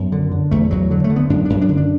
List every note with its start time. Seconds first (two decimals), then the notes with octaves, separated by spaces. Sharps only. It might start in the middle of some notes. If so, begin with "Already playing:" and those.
Already playing: F#2 B3
0.12 D3
0.32 D3
0.51 E2 A3
0.71 E2 F#3
0.90 D3 F#3
1.04 A3
1.10 D3
1.16 B3
1.30 F#2 D4
1.45 D4
1.50 F#2
1.61 D4
1.69 D3
1.77 D4